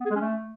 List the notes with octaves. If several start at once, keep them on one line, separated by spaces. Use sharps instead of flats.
B3
G#4
G#3
C#4
A3